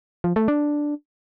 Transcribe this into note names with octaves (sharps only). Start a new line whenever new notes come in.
F3
A3
D4